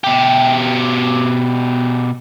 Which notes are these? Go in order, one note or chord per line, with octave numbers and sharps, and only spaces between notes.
B2 G4